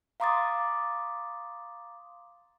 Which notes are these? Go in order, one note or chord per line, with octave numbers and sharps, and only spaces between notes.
F5 A#5 C6 D6 D#6 A6